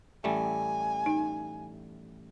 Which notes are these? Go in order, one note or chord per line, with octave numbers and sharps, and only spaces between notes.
A1 G3 A3 G#5
D#4